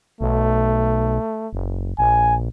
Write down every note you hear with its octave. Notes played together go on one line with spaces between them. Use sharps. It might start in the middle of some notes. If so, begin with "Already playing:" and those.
B1 A3
F#1
A#1 G#5